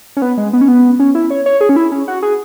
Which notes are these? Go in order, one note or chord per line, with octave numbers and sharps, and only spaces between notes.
C#4
B3
G#3
B3
C#4
B3
C#4
E4
C#5
C#5
G#4
C#4
E4
C#4
F#4
G#4